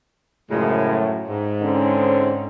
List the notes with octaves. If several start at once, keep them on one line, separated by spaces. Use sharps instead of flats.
F#2 A2 C#3 F3 G#3
G#2
D3 C4 C#4